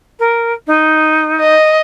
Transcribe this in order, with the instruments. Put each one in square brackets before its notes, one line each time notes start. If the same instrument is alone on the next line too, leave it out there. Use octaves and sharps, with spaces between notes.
[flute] A#4
D#4
[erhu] D#5